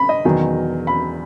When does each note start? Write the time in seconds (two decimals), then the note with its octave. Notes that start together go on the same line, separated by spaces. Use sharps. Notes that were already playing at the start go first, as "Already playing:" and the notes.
Already playing: B5
0.09 D#5
0.25 E1 E2 D#3 F#3
0.87 B5